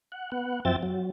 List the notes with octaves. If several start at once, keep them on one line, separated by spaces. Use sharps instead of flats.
F#5
B3 F#5
F#2 F3 C4 E5 G5 A6
F#3